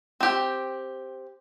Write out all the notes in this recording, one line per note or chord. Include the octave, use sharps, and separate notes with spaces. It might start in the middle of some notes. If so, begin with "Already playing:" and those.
C4 G4